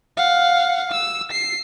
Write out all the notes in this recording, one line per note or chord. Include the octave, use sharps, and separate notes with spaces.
F5 F#5
E6
C7